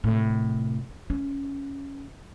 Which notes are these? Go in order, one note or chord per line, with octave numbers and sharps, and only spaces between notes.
A2 C3
C#4